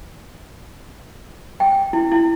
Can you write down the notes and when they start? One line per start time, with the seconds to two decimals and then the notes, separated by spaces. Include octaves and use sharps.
1.60 G5
1.93 E4
2.11 E4